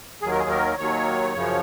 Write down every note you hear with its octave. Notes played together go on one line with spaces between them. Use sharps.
D#2 D#3 F#3 G#4
A#4
G#4
A#4
D#2 D#3 F#3 C#5
F#2 C#3 F3